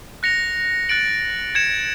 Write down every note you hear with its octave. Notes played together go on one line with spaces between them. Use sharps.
F#6 A#6 C#7 F7
F#6 A6 D7 F#7
G#6 C#7 E7